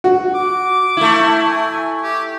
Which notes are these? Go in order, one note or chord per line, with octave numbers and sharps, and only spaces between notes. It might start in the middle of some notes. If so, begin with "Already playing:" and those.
F#4
D6
A3 E4
G#5
G4